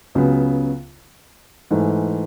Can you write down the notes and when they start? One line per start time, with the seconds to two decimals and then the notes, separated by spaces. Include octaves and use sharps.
0.15 C#2 C#3 F#3 B3
1.71 G#2 E3 A3